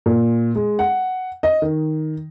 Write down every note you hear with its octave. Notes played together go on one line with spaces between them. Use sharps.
A#2
G#3
F#5
D#5
D#3